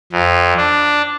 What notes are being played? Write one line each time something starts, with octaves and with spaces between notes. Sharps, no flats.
F2
D4